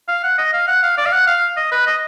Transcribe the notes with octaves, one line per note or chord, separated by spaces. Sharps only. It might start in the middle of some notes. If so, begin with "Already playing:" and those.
F5
F#5
D#5
F5
F#5
F5
D5
F5
F#5
F5
D#5
B4
D#5